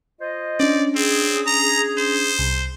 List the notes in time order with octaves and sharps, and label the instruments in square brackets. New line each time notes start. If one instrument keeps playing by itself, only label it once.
[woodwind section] F4 C5 D#5
[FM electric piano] C#4 D4 [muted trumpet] D5
[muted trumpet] C4 [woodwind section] G#4
[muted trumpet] A#5
C5
[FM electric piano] C2